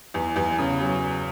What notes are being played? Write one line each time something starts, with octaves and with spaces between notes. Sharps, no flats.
E2
E2
C#3
F#3